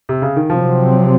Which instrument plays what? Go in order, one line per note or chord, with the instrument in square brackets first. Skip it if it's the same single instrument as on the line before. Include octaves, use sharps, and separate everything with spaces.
[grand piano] C3
C#3
D#3
[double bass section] C3 F#3 C4 [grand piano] F3